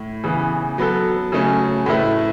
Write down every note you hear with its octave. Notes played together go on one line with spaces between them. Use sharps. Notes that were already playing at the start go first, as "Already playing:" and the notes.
Already playing: A2
C#3 E3 B3
F#3 B3 A4
C#3 F#3 A3 C#4
A2 A3 E4 B4